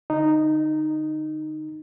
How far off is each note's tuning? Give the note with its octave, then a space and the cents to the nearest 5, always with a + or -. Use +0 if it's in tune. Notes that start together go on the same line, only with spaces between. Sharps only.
D3 +0 D#4 -10